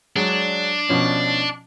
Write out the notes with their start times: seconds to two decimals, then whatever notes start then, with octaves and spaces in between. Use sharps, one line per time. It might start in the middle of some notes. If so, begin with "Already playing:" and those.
0.16 F#3 G#3 D4
0.89 B2 F3 C#4